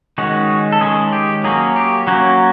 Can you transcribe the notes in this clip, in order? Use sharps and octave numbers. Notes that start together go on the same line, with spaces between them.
D#3 G#3 C#4 F#4
A4
D#3 G#3 C#4 G#4
G4
F#3 A#3 C#4 G#4
G4
F#3 A#3 C#4 F#4